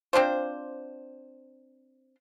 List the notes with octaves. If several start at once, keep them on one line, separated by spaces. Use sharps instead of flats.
C4 D4 F4 C5